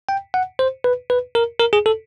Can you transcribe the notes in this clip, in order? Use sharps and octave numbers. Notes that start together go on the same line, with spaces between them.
G5
F#5
C5
B4
B4
A#4
A#4
G#4
A4